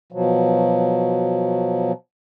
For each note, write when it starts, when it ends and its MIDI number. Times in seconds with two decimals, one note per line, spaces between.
0.12 1.92 47
0.12 1.92 53
0.12 1.92 54